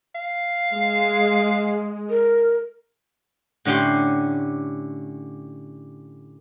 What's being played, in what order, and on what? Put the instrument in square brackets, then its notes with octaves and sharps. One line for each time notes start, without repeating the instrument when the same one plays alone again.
[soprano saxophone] F5
[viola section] G#3
[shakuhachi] A#4
[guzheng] A2 D3 C#4 G4 C6